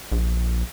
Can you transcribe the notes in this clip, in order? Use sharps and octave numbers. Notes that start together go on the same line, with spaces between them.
A#1